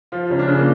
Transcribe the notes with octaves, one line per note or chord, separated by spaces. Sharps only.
F3 F4
C#2 C#4
D4
C#3
A#3